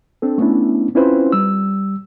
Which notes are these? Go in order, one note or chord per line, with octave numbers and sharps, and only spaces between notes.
C4 D4 A4
A3 B3 C#4 D4 E4
C4 C#4 E4 F4 B4 C5
G3 E6